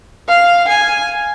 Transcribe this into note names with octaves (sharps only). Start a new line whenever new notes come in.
F5
G#5